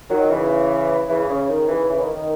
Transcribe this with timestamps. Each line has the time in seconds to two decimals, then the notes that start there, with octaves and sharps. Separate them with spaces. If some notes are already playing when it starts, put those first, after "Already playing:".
0.10 D#3 F#3
0.30 C#3 E3
1.09 C#3 E3
1.29 C#3
1.49 D#3
1.68 C#3 E3
1.89 C#3 E3
2.01 D#3
2.15 D#3